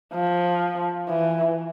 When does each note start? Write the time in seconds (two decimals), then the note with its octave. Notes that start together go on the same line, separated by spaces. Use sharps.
0.14 F3
1.09 E3